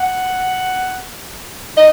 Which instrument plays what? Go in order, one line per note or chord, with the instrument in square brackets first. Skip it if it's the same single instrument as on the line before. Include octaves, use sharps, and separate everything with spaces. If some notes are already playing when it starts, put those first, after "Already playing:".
Already playing: [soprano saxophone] F#5
D#5